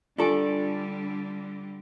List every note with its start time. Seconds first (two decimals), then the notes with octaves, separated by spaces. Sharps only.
0.18 D3 G3 D4 F4 G4 A4 G#5